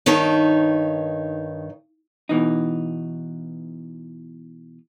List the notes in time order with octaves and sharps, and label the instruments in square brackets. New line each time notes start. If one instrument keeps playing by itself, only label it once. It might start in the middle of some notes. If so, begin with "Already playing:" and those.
[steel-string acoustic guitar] G2 D#3 D#4 B4 C#5 A5
[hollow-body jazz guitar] B2 E3 D#4